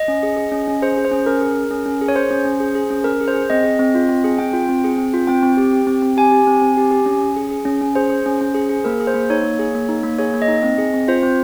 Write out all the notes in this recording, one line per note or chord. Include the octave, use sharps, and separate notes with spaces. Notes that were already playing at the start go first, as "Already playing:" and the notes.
Already playing: D#5
C#4
G#4
G#4
C#4
C#4
G#4 C5
G#4
C5
C#4
C#4 A#4
G#4
G#4
C#4
C#4
G#4
C#5
G#4 C5
C#4
C#4
G#4
G#4
C#4
C#4 A#4
G#4
C5
G#4
C4 D#5
G#4
C4
F4
C4
G#4
C4 G5
F4
C4
G#4
C4
F4
C4 G5
C4
G4
G4
C4
C4
G4 G#5
G4
C4
C4
G4
G4
C#4
C#4
G#4
G#4
C#4
C#4
G#4 C5
G#4
C#4
C#4
G#4
G#4
A#3 A#4
G#4
C5
A#3
D#4 C#5
A#3
G#4
A#3
D#4
A#3
G#4 C#5
A#3
D#5
D#4
C4
G#4
C4
F4 C5
C4